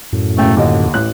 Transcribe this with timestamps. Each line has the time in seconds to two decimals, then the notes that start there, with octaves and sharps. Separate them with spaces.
0.13 F#2 A2
0.37 E1 C#3 A3 G5
0.57 D#2 D3 D#5
0.94 A1 F#6